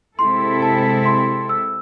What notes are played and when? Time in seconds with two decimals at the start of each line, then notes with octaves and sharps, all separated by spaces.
0.18 C3 G#3 C4 E4 A4 C6
0.62 A5
1.05 C6
1.49 E6